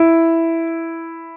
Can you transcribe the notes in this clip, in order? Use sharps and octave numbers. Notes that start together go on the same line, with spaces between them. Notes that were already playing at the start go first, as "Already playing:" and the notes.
Already playing: E4